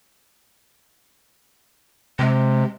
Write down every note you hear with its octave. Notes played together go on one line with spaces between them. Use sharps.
C3 G#3